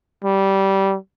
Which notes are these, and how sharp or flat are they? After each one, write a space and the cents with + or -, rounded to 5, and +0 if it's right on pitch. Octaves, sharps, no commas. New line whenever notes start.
G3 -15